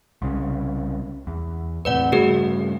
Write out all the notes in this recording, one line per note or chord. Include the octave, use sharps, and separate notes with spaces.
C2 C#3
E2
E2 A2 C3 B4 D5 F#5
G2 C#3 A3 F#4 G#4 A#4